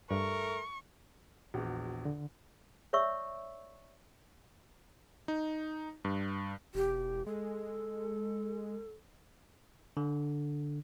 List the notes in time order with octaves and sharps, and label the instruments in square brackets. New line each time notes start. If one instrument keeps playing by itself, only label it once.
[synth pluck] G2 [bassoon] A3 [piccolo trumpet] A#4 [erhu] C#6
[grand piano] A#1 E2 [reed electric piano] F#4
[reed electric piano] D3
[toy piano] C#5 D5 E5 C#6 E6
[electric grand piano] D#4
G2
[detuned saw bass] E1 [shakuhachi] G4
[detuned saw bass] G#3 [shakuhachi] A4
[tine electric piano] D3